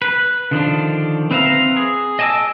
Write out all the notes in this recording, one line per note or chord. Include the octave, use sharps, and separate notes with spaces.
B4
D3 D#3 F3 D4
C4 B4 E5 F5 A#5
G#4
D#5 G#5 A5 D6 E6